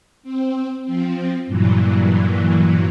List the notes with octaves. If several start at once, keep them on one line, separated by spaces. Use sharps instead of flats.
C4
F3 C4
G2 A#2 E3 F#3